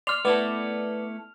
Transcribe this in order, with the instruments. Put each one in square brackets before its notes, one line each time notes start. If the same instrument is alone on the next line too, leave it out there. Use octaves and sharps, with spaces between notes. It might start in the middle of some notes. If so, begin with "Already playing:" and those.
[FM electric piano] D5 C6 [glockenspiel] F6 F7
[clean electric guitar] A3 E4 A4 [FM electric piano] B3 D5